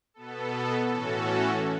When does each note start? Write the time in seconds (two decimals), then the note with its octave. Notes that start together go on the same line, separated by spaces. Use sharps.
0.14 B2 B3 A4
0.87 A2 E3 C#4 F#4 A4